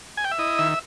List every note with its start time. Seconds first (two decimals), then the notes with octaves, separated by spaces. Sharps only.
0.17 G#5
0.24 G5
0.31 E5
0.39 E4 D#5
0.59 D#3 E5